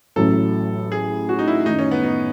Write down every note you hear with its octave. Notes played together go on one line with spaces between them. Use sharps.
A1 A2 F#3 A4
G#4
F#4
D#4
E4
F#2 D#3 A3 D#4
C#4
B3
D#4